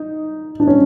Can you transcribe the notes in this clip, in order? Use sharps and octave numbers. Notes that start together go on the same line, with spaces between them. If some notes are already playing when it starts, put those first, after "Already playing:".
Already playing: D#4
D4
C#4